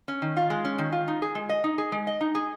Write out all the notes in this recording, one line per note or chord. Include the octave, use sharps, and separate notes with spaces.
C#4
D#3
F4
G#3
C#4
D#3
F4
D#4
G#4
G#3
D#5
D#4
G#4
G#3
D#5
D#4
G#4